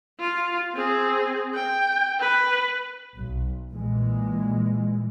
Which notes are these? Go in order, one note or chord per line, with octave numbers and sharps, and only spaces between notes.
F4
C4 G#4
G5
B4
B1
A#2 E3 G#3